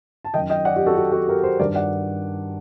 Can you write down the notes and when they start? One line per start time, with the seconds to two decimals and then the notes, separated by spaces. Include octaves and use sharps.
0.25 A5
0.34 F#2 D#3 D#5 G5
0.50 D#5 G5
0.65 D5 F#5
0.76 G4
0.86 F#4 A4
0.96 G4
1.12 F#4 A4
1.28 G4 A#4
1.43 A4 C5
1.59 G2 D#3 A#4 D5
1.75 D5 F#5